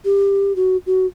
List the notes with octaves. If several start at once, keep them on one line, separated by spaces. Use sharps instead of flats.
G4
F#4
F#4